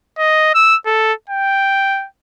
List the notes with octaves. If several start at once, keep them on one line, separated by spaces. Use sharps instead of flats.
D#5
E6
A4
G5